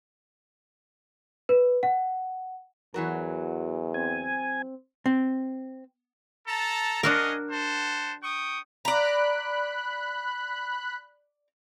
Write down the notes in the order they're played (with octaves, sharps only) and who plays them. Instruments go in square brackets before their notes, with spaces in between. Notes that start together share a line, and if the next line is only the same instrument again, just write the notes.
[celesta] B4
F#5
[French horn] E2 [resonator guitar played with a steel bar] E3 F#3 A#4 [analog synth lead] F#4
[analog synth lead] C4 [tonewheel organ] G#5
[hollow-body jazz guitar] C4
[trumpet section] A4 A5 A#5
[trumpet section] C#4 G#4 D#5 [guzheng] D4 F#4 A#4
[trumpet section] C5 F#5 A5
G5 C#6 D#6
[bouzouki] D5 A#5 [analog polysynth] B5 F#6